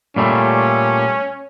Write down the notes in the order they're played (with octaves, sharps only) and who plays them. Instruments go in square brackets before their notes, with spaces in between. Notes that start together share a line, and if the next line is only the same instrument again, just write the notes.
[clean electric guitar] A#2 G3 A3 [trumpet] C#4